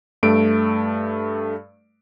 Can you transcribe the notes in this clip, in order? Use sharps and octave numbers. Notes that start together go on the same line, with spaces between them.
G2 A3 D7